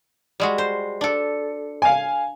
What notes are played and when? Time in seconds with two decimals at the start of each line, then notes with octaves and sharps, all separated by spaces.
0.40 G3 G#3 F#4
0.58 C5
1.01 D4 A4
1.82 F5 G#5